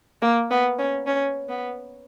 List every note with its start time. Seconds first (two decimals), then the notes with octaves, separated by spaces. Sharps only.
0.22 A#3
0.50 B3
0.79 C#4
1.06 C#4
1.49 B3